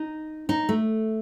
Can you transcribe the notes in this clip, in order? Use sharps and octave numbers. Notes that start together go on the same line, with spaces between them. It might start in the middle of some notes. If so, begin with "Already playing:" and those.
Already playing: D#4
D#4
A3